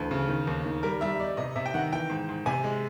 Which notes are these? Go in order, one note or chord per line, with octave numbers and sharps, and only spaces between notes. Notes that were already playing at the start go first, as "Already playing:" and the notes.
Already playing: D2 E3 A4
C#3
D#3
D#2
D#3
G3 A#4
G3 E5
D#4 D5
C3 D#5
C3 E5
G5
D#3 F#5
E3 G5
G#2
G#2
C3 G#5
G#3